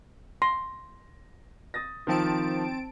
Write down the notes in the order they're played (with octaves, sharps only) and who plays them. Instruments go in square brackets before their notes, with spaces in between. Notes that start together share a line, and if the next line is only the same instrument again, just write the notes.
[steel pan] C6 [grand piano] A#6
[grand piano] D#6 A6 A#6
[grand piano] D#3 F3 [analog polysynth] C4 A5 D7